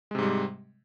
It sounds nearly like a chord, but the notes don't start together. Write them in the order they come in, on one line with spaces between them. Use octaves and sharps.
G#3 C3 G#2 G3